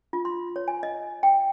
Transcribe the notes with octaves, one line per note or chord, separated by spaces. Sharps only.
F4
C6
C#5
G#5
D#5
G5